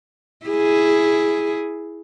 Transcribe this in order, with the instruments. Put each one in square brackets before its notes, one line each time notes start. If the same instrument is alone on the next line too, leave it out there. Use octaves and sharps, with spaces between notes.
[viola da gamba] E4 G#4